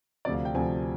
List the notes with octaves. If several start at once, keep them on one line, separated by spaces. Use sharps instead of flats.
D2 C3 F3 D5
F5
G5
D2 C3 F3 G#5